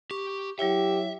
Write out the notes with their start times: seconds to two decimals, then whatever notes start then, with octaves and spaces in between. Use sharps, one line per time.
0.11 G4 C#6
0.59 F#3 E4 G4 C#5 E5